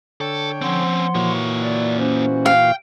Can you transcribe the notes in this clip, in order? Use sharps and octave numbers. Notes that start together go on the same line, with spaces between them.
D3 A4 C#5 G5
F3 C4 C#4 F#5 C6
A#2 E3 A#3 F#4 C#5
D5
C#4 C5
F5 G5